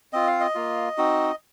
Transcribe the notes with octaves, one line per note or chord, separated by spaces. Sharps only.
C4 F4 D#5
F5
D#5
A#3 F4
C4 D#4 F#4